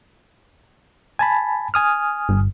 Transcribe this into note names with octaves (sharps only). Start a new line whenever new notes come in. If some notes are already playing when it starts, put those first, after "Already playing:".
G#5 A5 B5
G#5 D#6 F6
G1